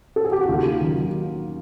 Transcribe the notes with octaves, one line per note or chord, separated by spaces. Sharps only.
A4
G#4
G4
F#4
D#2 F4
D#3 F#3